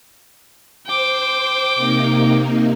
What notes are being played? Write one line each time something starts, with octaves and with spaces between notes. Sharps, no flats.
C5 G5 D6
C3 A#3 D#4